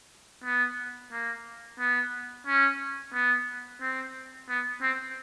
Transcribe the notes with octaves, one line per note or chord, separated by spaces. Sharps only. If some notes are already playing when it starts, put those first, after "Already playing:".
B3
A#3
B3
C#4
B3
C4
B3
C4